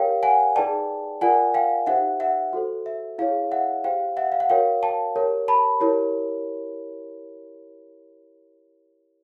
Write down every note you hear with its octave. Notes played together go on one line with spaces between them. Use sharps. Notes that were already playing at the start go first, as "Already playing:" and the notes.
Already playing: G4 A#4 C#5 F5 G5
F#5 G#5
D#4 G#4 B4 D5 G5 A5
F4 A#4 D5 F#5 G#5
F5 G5
D#4 G4 C5 E5 F#5
E5 F#5
F#4 A4 C5
E5
E4 G#4 C#5 F5
E5 F#5
G4 C5 F5 G5
E5 F#5
F5
F#5
F#4 A#4 C#5 F5 G5
G5 A5
G4 A#4 C#5
A5 B5
E4 G4 A#4 C#5